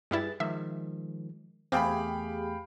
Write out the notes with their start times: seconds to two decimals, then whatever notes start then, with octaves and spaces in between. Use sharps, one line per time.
0.11 G2 G3 E4 G#4 B4 A6
0.40 D#3 F3 G#3 E5
1.72 E2 A3 C4 G4 G#4 F5 G5 B5